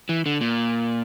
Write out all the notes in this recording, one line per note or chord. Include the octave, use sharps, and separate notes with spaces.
E3
D3
A#2